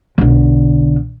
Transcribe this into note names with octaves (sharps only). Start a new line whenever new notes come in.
B1 D3